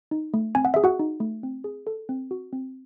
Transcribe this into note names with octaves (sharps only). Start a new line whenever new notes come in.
D#4
A3
C4 G#5
F#5
G#4 E5
F#4 F#5
D#4
A3
C4
G#4
A4
C4
F#4
C4